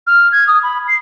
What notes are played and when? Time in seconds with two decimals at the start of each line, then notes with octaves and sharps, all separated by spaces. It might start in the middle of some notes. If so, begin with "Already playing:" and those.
0.07 F6
0.32 G#6
0.47 D#6
0.63 B5
0.88 C7